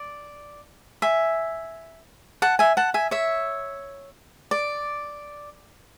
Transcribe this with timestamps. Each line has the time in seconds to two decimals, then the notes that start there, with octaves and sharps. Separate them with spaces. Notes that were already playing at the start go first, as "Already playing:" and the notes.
Already playing: D5
1.02 E5 G#5
2.42 F#5 A5
2.59 E5 G#5
2.77 F#5 A5
2.94 E5 G#5
3.11 C#5 E5
4.51 D5